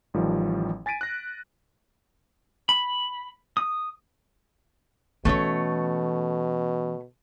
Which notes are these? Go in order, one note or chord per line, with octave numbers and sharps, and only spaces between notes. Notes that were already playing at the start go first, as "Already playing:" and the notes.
A1 D#3 F3 G3
G#5 A6 B6 D7 D#7
F#6 A#6
B5
D#6
B2 E3 A3 C#4 C#5